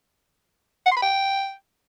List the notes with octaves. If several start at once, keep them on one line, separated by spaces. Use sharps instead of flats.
F#5
C6
B5
G5